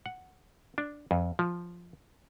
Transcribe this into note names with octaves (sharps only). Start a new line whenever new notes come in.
F#5
D4
F2
F3